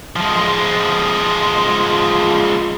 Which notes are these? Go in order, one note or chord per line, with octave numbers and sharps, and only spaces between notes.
F3 G#3